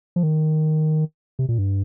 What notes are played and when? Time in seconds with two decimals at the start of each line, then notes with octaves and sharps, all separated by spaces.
0.16 F3
0.23 D#3
1.39 C3
1.49 A#2
1.58 G2